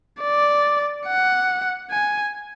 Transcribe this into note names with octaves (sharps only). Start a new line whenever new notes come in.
D5
F#5
G#5